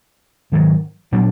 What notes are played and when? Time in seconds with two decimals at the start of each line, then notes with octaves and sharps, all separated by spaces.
0.52 G#2 D#3 F#3
1.12 A#2 F#3 B3 D4